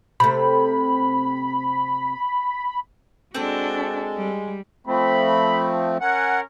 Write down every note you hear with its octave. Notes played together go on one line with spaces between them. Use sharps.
C3 A3 B5
G#3 C4 D4 F#4 A4
G3
F3 A3 C4 B5
C#4 A#4 F#5 G#5